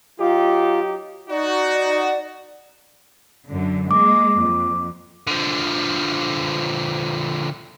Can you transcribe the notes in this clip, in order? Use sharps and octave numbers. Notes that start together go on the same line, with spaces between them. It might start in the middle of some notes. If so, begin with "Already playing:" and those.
F#3 D#4 F4 G4
D#4 F#4 D5
F#2 D3
G#3 A#3 D6
F2
D3 F3